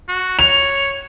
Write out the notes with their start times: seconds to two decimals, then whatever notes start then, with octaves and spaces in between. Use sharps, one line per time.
0.08 F#4
0.39 C#5 F7